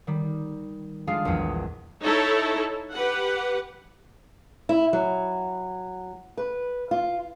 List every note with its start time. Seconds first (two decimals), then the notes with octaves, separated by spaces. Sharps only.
0.07 D#3 G3
1.07 G#3 D4 F4 G#4 F5
1.25 A#1 E2 D#7
2.03 D#4 E4 A4 C#5
2.93 G4 B4 F#5
4.69 E4
4.93 F#3
6.37 B4
6.91 F4